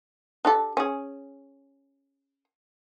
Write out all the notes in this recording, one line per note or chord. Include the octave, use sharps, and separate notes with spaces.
D4 G4 A4
C#4 G#4